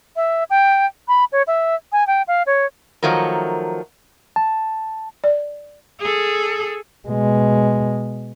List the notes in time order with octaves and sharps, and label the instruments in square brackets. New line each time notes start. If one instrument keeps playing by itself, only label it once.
[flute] E5
G5
B5
C#5
E5
G#5
G5
F5
C#5
[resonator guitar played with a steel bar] D#3 F3 F#3 A3 A#4
[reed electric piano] A5
[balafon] D5
[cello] G#4 A4
[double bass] B2 G#3